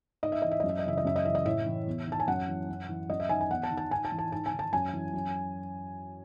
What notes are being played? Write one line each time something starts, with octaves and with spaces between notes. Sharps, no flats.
G#2 D#5
E5
E3 D#5
E5
F#2 D#5
E5
D#5
C#3 E3 E5
D#5
F#2 E5
D#5
C#3 E3 E5
D#5
A2 E5
E3
E2
D#3 A5
G#5
F#2 F#5
E3
F#2
E3
F#2 D#5
E5
D#3 G#5
G#5
E2 F#5
A5
D#3
A5
G#2 G#5
A5
E3
A5
G#2 A5
G#5
D#3
A5
F#2 G#5
E3
F#2